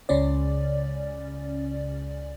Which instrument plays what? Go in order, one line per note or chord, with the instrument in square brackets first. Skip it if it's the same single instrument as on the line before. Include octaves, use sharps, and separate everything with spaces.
[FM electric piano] C#2 C#3 C#4 D5